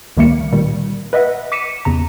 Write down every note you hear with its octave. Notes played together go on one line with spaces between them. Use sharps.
C#2 D#3 G3 A3 A#3 C#7
A#2 D#3 G3
B4 D#5 E5 F#5
D6 B6 C#7 D#7 E7
E2 C#3 A#5